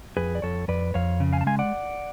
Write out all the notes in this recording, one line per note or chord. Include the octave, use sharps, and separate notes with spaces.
F2 G#4 B4
D5
F2 A4 C#5
F2 B4 D5
F2 C#5 F5
C#3
F5 G#5
A5
G#3 F5 G#5
D5 F#5